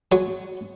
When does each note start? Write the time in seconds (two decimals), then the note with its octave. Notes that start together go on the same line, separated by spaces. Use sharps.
0.12 F#3 G#5